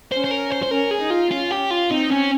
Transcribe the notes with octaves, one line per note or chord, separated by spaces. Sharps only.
C#4 C5
C5
A#4
C5
C5
C#4 A#4
G#4
D#4
F4
C#4 F4
G4
F4
C4 D#4
C#4